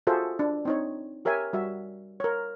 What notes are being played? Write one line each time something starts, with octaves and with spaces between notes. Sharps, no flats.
F4 F#4 G#4 A4 C5 E5
D4
C4 D#4 C#5
G4 A#4 C#5 E5 G#5
G3 F#4 E5
A#4 C#5